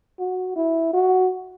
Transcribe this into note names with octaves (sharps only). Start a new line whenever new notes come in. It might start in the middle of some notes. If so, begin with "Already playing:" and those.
F#4
E4
F#4